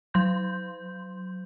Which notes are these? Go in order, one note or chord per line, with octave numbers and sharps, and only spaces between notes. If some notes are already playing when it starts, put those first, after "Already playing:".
F#3 C6 G6